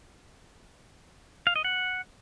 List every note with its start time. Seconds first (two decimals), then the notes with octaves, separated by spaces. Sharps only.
1.47 F5
1.56 D#5
1.64 F#5